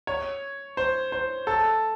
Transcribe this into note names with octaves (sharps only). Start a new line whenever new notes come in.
C#5
C5
C5
A4